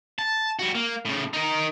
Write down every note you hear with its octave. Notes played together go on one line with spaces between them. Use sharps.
A5
G3 F#4
A#3
A2 C#3
D#4 A#4